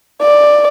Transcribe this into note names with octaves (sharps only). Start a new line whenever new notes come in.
D5